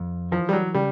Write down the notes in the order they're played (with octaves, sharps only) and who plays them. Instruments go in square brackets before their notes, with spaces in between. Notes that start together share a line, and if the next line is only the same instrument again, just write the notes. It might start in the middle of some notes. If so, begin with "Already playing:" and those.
Already playing: [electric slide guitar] F2
[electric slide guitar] E3 [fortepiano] F3
[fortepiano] G3
F#3
[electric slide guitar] C#3 [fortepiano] G3